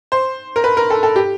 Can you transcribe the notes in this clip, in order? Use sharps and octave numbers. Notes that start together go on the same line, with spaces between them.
C5
A#4
B4
A#4
A4
A4
G4